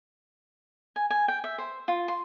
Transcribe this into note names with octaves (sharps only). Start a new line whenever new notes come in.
G#5
G#5
G5
E5
C5
F4
C6